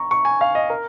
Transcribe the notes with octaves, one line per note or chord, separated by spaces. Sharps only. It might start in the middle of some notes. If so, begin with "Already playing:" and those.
Already playing: A#5 C#6
C#6
G#5
F5
D#5
A#4